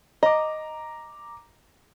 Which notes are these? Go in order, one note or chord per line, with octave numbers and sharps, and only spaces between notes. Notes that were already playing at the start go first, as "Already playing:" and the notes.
D#5 A#5 D6